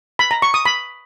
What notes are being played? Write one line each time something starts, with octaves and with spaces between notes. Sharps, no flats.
B5
A#5
C#6
D#6
B5